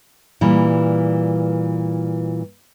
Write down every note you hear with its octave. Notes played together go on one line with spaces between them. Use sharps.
A#2 E3 G3